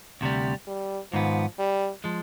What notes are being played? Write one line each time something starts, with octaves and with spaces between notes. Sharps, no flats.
D2 C3 G3
G3
G#2 D#3 F3 B3
G3
F3 G#3